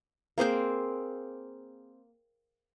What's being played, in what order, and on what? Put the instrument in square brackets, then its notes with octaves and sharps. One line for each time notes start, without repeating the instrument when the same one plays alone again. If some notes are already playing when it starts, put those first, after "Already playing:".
[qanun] A#3 C4 G#4 C5